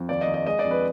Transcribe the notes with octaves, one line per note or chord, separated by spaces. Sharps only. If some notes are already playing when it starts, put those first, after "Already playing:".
Already playing: F2
D#2 D5
D#5
D#2
D#5
G#3 D#5
D5
F2
B4